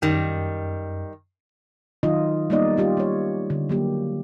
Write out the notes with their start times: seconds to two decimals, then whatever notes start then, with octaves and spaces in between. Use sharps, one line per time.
0.02 F#2 D#3 G3
2.03 D#3 F#3 D#4 F4 D#5
2.50 G3 A#3 B3 D#4 D5 D#5
2.77 G3 F4 G4
2.97 G3 C#5
3.50 D3
3.70 F#3 A#3 G4